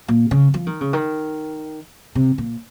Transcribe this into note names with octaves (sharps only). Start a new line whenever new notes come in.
A#2
C#3
F3
D#3
C#3
D#3
C3
A#2